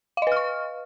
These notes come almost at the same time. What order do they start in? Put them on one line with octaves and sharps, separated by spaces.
F5 D#5 B4 F6 C#6